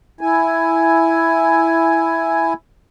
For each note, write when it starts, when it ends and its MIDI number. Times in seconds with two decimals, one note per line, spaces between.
0.21 2.53 64
0.21 2.53 80